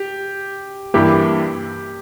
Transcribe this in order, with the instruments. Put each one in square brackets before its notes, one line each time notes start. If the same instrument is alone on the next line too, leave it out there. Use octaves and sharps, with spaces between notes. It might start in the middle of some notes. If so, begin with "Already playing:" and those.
Already playing: [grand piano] G4
[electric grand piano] G2 E3 A#3 E4 [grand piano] G4